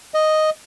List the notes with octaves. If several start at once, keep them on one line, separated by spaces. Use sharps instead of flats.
D#5